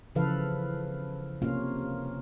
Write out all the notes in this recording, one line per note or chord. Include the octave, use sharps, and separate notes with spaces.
C#3 E3 F3 A4 B4 F5
C3 A#3 C#4 F4 F5